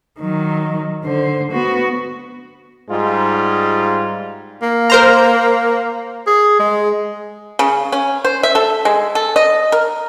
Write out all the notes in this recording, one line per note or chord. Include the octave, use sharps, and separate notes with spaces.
D#3 F#3
D3 C5
B3 F#4
G#2 G3 G#3 D#4 F4
A#3
A#4 C5 A#5
G#4
G#3
C#3
C#4
C5
E5
A4
G#3
A4
D#5
A#4